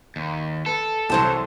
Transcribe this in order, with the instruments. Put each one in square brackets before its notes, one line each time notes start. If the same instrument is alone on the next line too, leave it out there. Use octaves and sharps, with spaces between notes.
[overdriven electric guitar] D#2
[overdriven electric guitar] A4 [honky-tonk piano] B4
[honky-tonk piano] C2 E3 [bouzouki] F#3 C5 A5